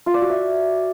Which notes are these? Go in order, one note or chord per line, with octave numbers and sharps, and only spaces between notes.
F4
D5
F#4
E5